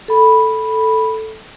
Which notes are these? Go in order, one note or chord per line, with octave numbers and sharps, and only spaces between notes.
A4 B5